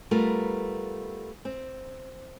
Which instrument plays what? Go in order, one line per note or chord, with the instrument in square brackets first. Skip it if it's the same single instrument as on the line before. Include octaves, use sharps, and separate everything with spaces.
[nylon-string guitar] G3 A3 B3 F4 A#4
C4